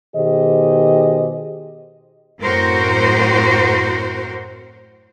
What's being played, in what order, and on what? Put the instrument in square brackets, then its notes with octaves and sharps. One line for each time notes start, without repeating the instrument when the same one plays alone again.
[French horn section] B2 D#3 G4 G#4 C5 D#5
[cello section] F#2 A2 C4 F#4 A#4 C5